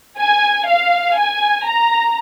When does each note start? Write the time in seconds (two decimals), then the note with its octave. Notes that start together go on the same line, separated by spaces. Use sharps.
0.19 G#5
0.68 F5
1.17 G#5
1.65 A#5